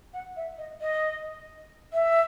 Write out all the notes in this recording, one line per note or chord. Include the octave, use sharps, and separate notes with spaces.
F#5
E5
D#5
D#5
E5